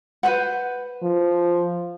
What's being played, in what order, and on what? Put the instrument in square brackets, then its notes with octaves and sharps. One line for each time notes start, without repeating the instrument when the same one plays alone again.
[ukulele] B4 C5 F#5
[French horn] F3